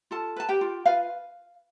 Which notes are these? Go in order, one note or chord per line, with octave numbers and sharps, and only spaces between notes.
F4 A4 A5
B4 A5
G4 G5
F4
F4 B4 F5